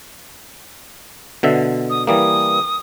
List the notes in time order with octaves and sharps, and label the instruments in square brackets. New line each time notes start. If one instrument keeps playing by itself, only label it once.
[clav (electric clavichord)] B2 D3 E5
[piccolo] D#6
[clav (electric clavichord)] E3 G3 A#3 [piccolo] D#6